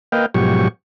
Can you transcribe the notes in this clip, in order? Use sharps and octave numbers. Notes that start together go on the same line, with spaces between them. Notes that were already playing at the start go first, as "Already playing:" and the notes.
A#3 B4 D#5 F5 G5
G#2 B2 F3 F#3 G4 C#6